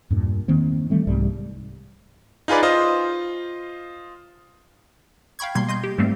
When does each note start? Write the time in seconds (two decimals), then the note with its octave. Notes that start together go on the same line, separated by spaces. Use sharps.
0.10 E2 G2 A#2
0.48 D#3 A#3 C4
0.90 E3 G3 A3 C4
1.07 C2 G#2 G3
2.48 D#4 F4 G#4 B4 D5
2.63 F4 C5 D#5
5.39 F5 G5 B5 C#6 G#6
5.55 B2 G3 A#3 C6 G#6 C7
5.68 D#5 C6 G6
5.84 G4
5.98 G#2 G3 A3 A#3 C4